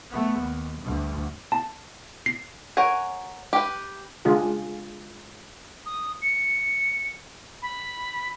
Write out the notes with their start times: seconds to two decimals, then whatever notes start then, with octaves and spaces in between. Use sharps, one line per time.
0.10 A3 B3
0.40 D#2
0.82 D2 G2
1.52 A5
2.26 C7
2.77 A#4 C#5 F#5 G#5
3.53 G4 B4
4.25 C#3 G#3 D4 F4 G#4
5.86 D#6
6.22 C#7
7.62 B5